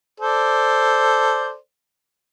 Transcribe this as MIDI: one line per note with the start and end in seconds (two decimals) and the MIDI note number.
0.20 1.55 69
0.20 1.55 72
0.20 1.55 74